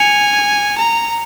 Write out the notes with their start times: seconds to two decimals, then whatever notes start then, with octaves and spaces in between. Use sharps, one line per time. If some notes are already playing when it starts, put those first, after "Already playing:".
Already playing: G#5 C#7 F7
0.78 A#5